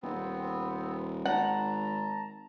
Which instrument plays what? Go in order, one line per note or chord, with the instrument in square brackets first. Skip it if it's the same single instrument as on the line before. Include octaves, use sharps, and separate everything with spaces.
[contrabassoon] D#1 [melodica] B3 C4
[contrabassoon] G#1 [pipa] F#5 [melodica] A5 A#5